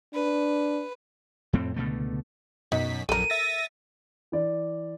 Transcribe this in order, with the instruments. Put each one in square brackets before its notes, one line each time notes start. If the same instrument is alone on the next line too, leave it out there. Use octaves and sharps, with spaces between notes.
[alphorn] D4 [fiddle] B4
[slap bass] F2 A2 C4
C#2 B2 D3 A3
[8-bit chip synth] F#2 B2 B6 [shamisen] D#4
[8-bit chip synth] A#1 F#2 [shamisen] A4 A#4 [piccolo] D#7
[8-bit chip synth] E5 A6 A#6
[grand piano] E3 D5